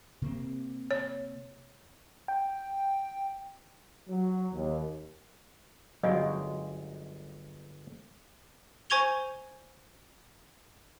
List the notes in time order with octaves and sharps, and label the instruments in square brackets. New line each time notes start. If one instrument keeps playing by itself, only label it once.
[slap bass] C3 A#3 C4
[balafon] C#5
[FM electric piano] G5
[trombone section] F#3
D#2
[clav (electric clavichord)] G1 G#3 G5 [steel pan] F#3 [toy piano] D#5 F5
[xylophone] C5 G#5 C#6 G#6 F7 G7